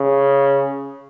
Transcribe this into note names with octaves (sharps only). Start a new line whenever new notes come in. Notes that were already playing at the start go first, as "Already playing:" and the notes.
Already playing: C#3